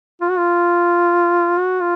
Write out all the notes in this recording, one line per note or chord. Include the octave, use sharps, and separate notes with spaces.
F4
F#4
F4
F#4
F4